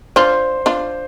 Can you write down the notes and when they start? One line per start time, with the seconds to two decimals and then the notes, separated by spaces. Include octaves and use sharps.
0.16 D4 F4 C5
0.66 D4 F4